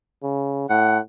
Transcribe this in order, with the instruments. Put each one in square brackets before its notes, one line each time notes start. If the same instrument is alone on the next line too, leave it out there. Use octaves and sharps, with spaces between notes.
[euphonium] C#3
[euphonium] A2 [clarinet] F#5